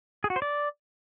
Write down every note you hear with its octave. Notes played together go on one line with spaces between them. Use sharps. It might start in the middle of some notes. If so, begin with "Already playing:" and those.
G#4
F#4
C5
D5